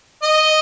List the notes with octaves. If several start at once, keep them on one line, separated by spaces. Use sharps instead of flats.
D#5